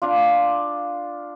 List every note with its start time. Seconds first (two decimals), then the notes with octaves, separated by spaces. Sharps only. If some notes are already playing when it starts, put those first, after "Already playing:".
0.02 D4 F4